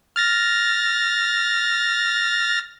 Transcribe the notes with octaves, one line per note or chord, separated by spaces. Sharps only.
F6 A6 A#6